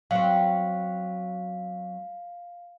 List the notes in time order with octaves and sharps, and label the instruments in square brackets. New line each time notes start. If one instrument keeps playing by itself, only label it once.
[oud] F#3 C4 [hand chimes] F5